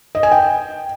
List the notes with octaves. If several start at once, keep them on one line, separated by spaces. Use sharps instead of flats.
D#5
G#5
G5